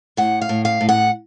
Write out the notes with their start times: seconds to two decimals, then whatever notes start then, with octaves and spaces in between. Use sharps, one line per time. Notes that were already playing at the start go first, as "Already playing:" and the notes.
0.17 A2 F#5
0.42 F5
0.49 A2
0.65 F5
0.81 A2
0.89 F#5